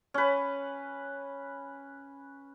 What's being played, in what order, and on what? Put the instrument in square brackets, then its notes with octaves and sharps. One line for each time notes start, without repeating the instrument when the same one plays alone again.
[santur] C#4 B4